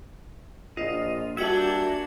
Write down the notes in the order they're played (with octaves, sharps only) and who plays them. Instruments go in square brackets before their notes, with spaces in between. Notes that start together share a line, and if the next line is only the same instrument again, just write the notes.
[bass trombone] A#1 [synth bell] F4 [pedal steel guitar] D#5
[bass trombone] G3 [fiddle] A#3 D4 [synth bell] F#4 G#6 [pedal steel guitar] E5 G5 G#5